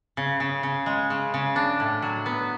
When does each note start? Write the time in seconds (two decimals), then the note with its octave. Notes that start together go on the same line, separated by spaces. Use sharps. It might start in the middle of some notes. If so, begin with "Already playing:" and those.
0.17 C#3
0.40 C#3
0.63 C#3
0.86 G#3
1.10 C#3
1.34 C#3
1.56 D4
1.80 A2
2.02 F#3
2.26 B3